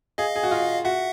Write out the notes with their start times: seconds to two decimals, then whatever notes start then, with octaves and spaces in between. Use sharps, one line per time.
0.18 G#4 D#5 F5
0.36 G#4
0.43 F#4
0.51 F4
0.85 F#4 E5 F#5